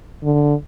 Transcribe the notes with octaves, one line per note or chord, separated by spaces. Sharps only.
D3